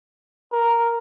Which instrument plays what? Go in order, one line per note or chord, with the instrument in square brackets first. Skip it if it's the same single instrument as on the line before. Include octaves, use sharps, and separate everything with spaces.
[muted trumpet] A#4